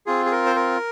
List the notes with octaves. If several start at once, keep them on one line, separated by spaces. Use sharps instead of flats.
C4 F4 G#4
G#4
A#4
C5
A#4